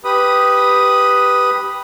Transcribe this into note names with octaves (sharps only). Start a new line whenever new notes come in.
G4 B4 B5 D#6